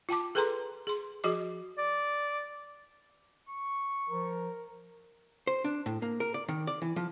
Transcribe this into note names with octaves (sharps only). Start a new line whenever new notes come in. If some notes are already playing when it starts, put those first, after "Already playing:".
F4 G5 A5 D6
G#4 A4 B4 G5 A#5 C6
G#4 C6
F3 F#4 G#4 D#5 D6
D5
C#6
F3 A#4
C5
D4
A2
A#3
A#4
D5
D#3
D5
E3
F3